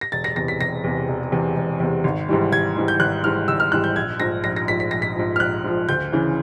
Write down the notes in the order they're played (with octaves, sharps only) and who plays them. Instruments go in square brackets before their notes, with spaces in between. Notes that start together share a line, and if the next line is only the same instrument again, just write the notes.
[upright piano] A#6
E1 A6
A#6
E2 C3 A#6
B6
E1 A#6
E2 C3
E1
E2 C3
E1
E2 C3
G#1
G#2 E3 G3
G#1 G#6
G#2 E3 G3
G6
G#1 F#6
G#2 E3 G3 F6
G#1 E6
F6
G#2 E3 G3 F#6
G6
A#1 G#6
G#2 F3 A#6
A#1 A#6
A#6
G#2 F3 B6
B6
A#1 A#6
B6
G#2 F3
F6
A#1 F#6
G#2 F3
D2 G6
C#3 E3